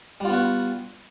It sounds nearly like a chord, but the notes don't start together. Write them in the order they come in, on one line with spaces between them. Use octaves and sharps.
G3 F4 B3 F#4